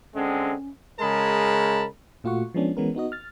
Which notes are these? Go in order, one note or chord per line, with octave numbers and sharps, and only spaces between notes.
D3 G#3 C4 C#4
C#3 G#3 G#4 A#4 A5 B5
A#2 A3 F4 F#4 F#5 C#6
F3 G#3 B3 C#4 D4
E3 G#3 B3 C#4 A#4
B3 D#4 F#4 D#5
F6 A6